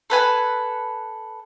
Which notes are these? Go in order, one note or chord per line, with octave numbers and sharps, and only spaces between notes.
A4 B4 G#5